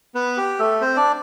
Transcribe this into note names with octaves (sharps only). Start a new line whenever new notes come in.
B3 B4
G4
A3 A4
C4 C5
D4 D5